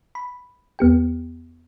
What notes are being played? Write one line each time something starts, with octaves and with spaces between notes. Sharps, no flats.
B5
E2 B3 G4 G5